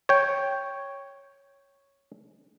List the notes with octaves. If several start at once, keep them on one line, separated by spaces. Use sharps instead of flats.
C#5 G5